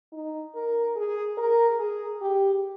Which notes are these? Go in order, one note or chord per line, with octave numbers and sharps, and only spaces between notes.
D#4
A#4
G#4
A#4
G#4
G4